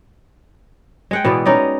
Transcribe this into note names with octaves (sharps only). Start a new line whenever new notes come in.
G#3 F#5 G5
B2 E3 B3 D5
C#4 D#4 D5 D#5